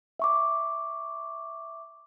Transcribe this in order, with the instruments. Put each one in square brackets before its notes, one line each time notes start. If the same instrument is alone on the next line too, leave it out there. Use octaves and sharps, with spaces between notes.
[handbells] E5 C#6 D6